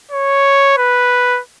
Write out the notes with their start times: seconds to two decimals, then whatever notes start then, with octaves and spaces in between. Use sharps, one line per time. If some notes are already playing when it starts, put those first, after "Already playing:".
0.11 C#5
0.78 B4